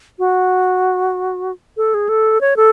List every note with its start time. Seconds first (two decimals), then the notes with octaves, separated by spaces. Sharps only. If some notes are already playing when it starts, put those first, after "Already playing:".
0.19 F#4
1.77 A4
1.94 G#4
2.09 A4
2.41 C#5
2.56 A4